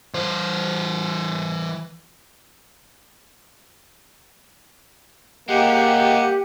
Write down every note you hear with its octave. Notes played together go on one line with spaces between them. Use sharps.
E3 C5
G#3 A#3 C#4 G4 F#5